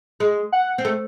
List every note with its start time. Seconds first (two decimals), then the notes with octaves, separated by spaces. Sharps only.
0.20 G#3
0.52 F#5
0.78 C4
0.85 A3